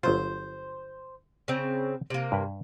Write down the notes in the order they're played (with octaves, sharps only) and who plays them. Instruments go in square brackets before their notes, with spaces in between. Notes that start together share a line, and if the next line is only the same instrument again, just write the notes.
[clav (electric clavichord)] G1 F#3 F4 [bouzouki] C5
[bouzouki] C#3 C4
C3 A#3
[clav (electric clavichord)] G2 B4